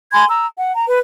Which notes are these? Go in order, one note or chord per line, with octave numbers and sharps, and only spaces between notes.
G#5 B5 C6 G#6
A#5 E6
F#5
A#5
B4